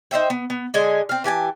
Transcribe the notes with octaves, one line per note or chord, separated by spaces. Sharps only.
D#4 C5 E5 G5
B3
B3
D3 G#3 D#5 G#5
C4 F5
E3 G4 G#5 A5